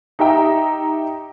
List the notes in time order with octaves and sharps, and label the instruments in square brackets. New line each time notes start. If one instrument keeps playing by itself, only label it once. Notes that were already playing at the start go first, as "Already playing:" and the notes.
[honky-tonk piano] D#4 G4 E5 G5 A#5